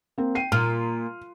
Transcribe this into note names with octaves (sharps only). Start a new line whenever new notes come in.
A#3 C4
G5 C7 D#7
A#2 F6